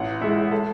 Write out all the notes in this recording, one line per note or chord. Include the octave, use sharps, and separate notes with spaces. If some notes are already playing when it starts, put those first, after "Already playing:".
Already playing: A1 F#5
A2 G#3 E5
A4